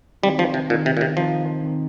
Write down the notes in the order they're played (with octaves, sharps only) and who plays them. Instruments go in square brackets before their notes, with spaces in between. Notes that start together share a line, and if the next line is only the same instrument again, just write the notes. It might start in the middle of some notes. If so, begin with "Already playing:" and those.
[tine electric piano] D#3 C4 D#4 [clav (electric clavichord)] G3
[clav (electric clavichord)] F3
C3
[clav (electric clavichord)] A#2 [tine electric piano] D#3 C4 D#4
[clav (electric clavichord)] C3
A#2
C3
[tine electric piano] D#3 C4 D#4 [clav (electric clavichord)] F3
[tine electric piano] D#3 C4 D#4